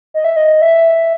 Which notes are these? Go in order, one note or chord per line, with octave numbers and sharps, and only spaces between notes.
D#5
E5
D#5
E5